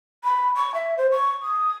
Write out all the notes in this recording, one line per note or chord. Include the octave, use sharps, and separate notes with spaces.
B5
C#6
E5
C5
C#6
D#6